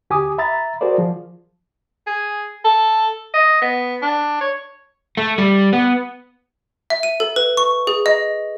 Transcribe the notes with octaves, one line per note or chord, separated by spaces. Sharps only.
D2 G4 G#5 D6 D#6
E5 A#5 B5 A6
F#4 G#4 A#4 C5 D5
F3
G#4
A4
D#5
B3
D4
C#5
A3
G3
B3
E5
D#7
A4
B4
C#6
G#4
D#5